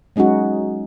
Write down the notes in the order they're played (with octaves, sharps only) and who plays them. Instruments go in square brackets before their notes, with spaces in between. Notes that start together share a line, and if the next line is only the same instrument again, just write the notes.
[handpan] F#3 G#3 C#4 D#4 F#4